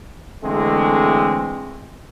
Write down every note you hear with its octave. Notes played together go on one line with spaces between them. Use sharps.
D3 E3 G#3 A3 C4